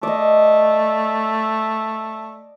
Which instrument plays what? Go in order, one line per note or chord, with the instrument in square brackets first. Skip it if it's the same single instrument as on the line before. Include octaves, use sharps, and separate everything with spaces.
[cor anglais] A3 [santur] D5 D#5